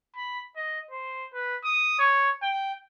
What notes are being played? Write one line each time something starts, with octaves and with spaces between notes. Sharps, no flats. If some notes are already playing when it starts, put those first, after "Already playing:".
B5
D#5
C5
B4
D#6
C#5
G5